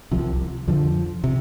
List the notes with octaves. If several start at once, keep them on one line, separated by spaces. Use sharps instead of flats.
C2 C3 F3
F2 D3 F3
C3